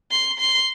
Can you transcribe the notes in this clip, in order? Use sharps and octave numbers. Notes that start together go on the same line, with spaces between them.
C6
C6